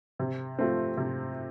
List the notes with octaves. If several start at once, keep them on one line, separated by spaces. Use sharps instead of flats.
C3
F3 A3 C4
C3